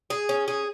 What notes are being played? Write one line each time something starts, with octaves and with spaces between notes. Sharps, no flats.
G#4
C#4
G#4